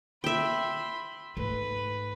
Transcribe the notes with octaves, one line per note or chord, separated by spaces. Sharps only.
E5 G5 B5 C6
G#2 A3 B4